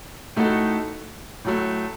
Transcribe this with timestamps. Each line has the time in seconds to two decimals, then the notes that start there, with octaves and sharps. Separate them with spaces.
0.36 A2 A3 D#4 F#4 A4
1.44 A2 F#3 A3